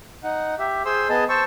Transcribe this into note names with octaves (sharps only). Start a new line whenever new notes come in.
D#4 F#5
G4 E5
G#4 C5 C6 E6
B3 G#4 D#5 A5
C5 A5 C#6 E6